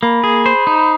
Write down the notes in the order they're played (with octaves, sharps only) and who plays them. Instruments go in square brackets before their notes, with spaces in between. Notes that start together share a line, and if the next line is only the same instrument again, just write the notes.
[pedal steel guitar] A#3 [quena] B5
[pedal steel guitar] G#4
C5
D#4